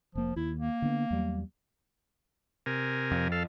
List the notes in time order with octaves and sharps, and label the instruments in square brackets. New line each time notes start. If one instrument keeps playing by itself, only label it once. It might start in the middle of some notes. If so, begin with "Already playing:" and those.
[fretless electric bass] F1 A#3 [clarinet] F3
[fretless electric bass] D#2 [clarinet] E4
[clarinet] A#3
[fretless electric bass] D3 B3
E2 F#3 G3
[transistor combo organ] C3 A#4 G#5
[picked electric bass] F2
[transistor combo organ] A4 F5